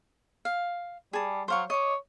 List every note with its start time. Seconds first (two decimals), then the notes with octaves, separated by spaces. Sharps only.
0.45 F5
1.13 G3 G#4 A5
1.48 F#3 C5 F5 C#6
1.70 C#5 D#5 D6